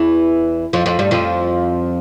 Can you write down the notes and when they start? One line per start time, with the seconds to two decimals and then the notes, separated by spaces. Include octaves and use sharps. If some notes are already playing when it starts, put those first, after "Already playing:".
Already playing: E2 E3
0.73 F2 F3
0.86 F2 F3
0.99 G2 G3
1.11 F2 F3